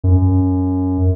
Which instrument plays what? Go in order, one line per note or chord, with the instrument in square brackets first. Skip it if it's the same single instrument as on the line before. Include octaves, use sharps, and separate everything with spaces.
[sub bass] F#2